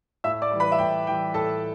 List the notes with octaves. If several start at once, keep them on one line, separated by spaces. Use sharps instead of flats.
A2 E5 E6
D5 D6
E3 G3
B4 B5
E5
A2 G5
E3 G3 G5
A2 A4 A5